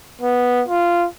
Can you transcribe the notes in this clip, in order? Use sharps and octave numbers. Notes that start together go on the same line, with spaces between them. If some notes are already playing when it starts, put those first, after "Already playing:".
B3
F4